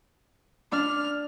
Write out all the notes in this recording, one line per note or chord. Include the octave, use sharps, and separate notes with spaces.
D4 F6